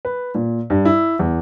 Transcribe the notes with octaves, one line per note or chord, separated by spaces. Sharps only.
B4
A#2
G2
E4
E2